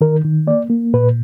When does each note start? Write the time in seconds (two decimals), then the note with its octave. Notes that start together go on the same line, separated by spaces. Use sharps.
0.01 D#3 A#4
0.24 D#3
0.47 A#3 D5
0.70 A#3
0.94 A#2 B4